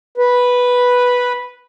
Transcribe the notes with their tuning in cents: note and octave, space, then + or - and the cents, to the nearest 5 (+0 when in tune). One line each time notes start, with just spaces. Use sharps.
B4 -5